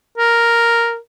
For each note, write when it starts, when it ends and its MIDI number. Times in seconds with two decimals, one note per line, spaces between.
0.18 0.97 70